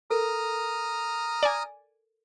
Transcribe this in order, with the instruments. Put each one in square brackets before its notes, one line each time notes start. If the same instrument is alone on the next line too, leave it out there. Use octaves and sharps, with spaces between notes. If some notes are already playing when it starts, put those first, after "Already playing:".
[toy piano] A4 A#4 [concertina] A#5 D#6 F6
[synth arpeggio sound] D5 G#5